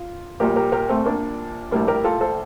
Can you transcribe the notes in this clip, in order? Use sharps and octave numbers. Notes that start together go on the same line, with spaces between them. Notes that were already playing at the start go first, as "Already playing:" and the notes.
Already playing: F4
A#1 A#2 G3 G4 A#4
G4 A#4
G4 A#4
A3 C4
A#3 D4
A#1 A2 G3 A#3 D4
G4 A#4
F4 A4
A4 C5